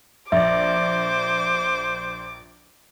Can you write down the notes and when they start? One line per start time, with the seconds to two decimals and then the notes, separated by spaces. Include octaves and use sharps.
0.32 A#1 C5 D5 E5 D6